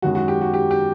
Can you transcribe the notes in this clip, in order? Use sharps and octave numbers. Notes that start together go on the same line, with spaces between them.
F#2 D#3 G#3 F#4
F#4
G4
F#4
G4
G4